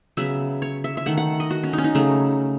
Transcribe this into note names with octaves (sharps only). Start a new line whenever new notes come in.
C#3 F#3 B3 E5
C#5
E5
E5
D#3 A3 F#5
F#5
D#5
F#4
C#4
D#4
C#4
D#4
C#3 F#3 A3